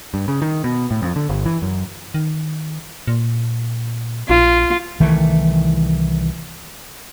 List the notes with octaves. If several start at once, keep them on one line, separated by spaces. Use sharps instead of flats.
G2
C#3
D#3
B2
A2
F2
D3
G1
E3
F#2
D#3
A#2
A#1 F4
C2 D#3 E3 A3